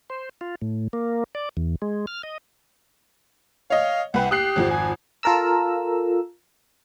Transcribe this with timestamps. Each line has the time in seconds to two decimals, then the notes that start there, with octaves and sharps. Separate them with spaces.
0.10 C5
0.41 F4
0.62 A2
0.93 A#3
1.35 D5
1.57 E2
1.82 G#3
2.07 F6
2.23 D#5
3.70 C#5 D#5 F5
4.14 C2 B4 F#5 G5
4.31 G4 D#6 F#6 C7
4.56 G#1 F2 F3
4.70 G#5
5.23 F4 A4 A#4 A#5 E6